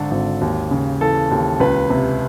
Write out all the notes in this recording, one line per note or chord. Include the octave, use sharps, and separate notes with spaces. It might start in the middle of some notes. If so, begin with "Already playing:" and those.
Already playing: G#1 D3 A4
G#1
D#2
C#3
E3 A4
D#2
C#2 B4
C3